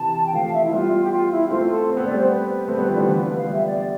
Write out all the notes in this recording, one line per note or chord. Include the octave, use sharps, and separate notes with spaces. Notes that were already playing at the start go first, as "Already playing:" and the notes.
Already playing: C3 E3 A5
G5
F3 A3 F5
E5
E4
G3 B3 F4
G4
F4
E4
G4
A3 C4 F4
A4
C4
B3
A3 D5
G3 B3
C5
B4
A3 C4
G3 B3
F3 A3
E3 G3
D3 F3
F5
G3 B3
E5
D5